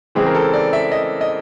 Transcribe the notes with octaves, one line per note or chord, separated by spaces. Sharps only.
C#3 E3 G#3 C4 G#4
A#4
A4
D5
E5
D#5
D#5